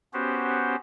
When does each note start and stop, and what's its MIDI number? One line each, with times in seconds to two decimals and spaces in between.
0.13 0.75 59
0.13 0.75 61
0.13 0.75 66
0.13 0.75 67
0.13 0.75 72